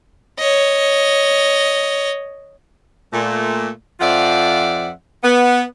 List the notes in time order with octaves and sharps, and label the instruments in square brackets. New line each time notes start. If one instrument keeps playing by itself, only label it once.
[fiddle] C#5 D#5
[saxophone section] A#2 A3
F2 F3 F4 D5 E5 F#5
B3